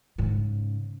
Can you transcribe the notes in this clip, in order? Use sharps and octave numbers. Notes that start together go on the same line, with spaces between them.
G#2 C#3